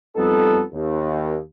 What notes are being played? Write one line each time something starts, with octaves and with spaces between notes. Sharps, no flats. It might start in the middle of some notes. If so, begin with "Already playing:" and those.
F2 G3 B3 D#4 A4
D#2